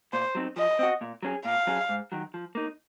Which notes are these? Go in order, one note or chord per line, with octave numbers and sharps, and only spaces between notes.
A#2 C5
F#3 C4 D#4
F3 D#5
C4 F#4
A#2
F#3 C#4 G#4
A#2 F5
F#3 C#4 G#4
G#2
D#3 F#3
F3
A#3 D#4